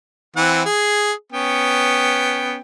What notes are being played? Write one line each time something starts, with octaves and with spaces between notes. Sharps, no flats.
E3 C4 F#5
G#4
B3 C#4 G5